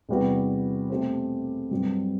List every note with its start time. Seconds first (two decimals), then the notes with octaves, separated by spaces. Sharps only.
0.09 E2 C3 G3 B3 F#4
0.90 B2 A3 C4 G4 C5
1.71 G2 F#3 C4